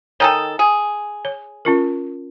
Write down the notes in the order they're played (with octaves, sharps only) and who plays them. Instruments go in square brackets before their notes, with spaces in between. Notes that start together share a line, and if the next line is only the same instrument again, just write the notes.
[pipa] D#3 D#4 A4 [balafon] C#5 G5 G#5
[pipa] G#4
[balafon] C#5
C#4 F4 A#4